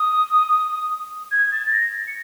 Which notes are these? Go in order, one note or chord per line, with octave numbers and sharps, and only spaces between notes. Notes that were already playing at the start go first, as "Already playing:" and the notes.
Already playing: D#6
G#6
A6
A#6
C#7